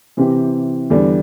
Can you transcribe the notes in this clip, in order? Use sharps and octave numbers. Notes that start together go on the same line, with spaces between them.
C3 E3 C4 G4
E2 D3 G3 D4